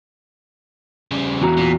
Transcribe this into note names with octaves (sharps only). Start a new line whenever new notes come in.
C#3 G3
E2 F#4 A#5
A#2